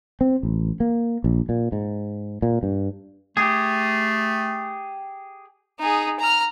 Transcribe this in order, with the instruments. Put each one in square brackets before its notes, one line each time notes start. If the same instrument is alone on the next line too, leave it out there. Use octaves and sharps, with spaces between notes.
[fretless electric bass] C4
A1
A#3
A#1
A#2
G#2
A#2
G2
[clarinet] A3 [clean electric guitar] G4 G#4
[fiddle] D#4 G#4
A#5 F6